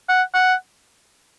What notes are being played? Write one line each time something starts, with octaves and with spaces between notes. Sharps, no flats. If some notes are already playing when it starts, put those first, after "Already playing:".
F#5
F#5